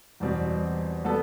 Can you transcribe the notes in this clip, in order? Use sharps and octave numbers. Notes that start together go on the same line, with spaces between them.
E2 B2 G3 C4 F#4
G3 B3 F#4 A4